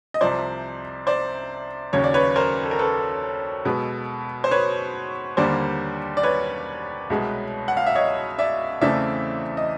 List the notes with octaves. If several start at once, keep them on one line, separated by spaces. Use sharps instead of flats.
D#5
C2 C3 F3 C5 D5
C5 D5
D#2 C#3 F#3 C#5
D5
B4 C#5
A#4 C5
A4
A#4
A4 B4
B2 G#3 B3
C5
B4 C#5
D#2 D3 G3 A#3 C5 D5
D5
B4 C#5
C2 B2 G#3 B3
F#5
F5
E5
C#5 D#5
D5 E5
E2 C#3 E3 A3 C4 D5 E5
D#5